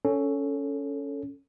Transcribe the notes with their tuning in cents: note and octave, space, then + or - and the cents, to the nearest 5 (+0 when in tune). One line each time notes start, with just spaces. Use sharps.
C#4 +10 A4 +5